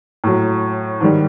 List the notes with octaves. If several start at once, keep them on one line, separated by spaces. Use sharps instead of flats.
A2 F#3
G#2 D#3 G3